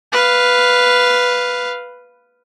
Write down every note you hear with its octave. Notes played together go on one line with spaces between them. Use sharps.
B4 F5